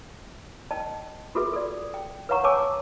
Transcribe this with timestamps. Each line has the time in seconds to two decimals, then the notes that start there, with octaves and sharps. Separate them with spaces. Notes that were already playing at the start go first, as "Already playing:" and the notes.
0.71 D#5 G5 A5
1.35 F4 F#4 G#4 A4 B4 E5
1.53 A4 D5
1.94 G5
2.29 B4 C#5 F5 F#5 A#5 C#6
2.44 C#5 F#5 G#5 A5 D6 E6